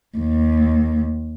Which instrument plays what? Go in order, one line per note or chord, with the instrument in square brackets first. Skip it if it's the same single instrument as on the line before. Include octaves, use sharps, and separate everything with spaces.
[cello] D#2